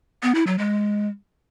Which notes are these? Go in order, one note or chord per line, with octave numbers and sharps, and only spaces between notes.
B3
E4
F#3
G#3